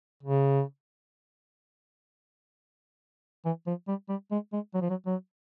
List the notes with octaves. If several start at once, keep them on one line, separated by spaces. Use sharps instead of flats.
C#3
E3
F3
G3
G3
G#3
G#3
F#3
F3
F#3
F#3